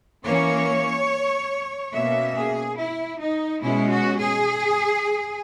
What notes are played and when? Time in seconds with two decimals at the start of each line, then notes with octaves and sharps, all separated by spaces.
0.24 E3 A#3 C#4 C#5
1.93 B2 A#3 C#4 E5
2.35 G#4
2.77 E4
3.20 D#4
3.62 B2 G#3 C#4 E4
3.90 F#4
4.18 G#4